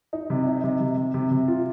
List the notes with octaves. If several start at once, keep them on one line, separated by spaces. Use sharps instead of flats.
D#4
C3
D#4
C3
C3
C3
C3
C3
F4